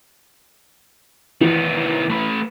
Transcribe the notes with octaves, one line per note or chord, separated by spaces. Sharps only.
D#3 E3 B3
A3 B4